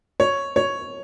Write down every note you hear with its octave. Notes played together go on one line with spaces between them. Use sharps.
C#5
C#5